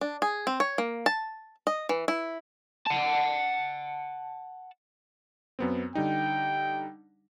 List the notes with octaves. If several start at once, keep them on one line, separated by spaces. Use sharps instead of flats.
D4
G#4
C4
C#5
A#3
A5
D#5
E3
E4
F#5 A5
F#2 B3 C4
D3 G3 D#4 G5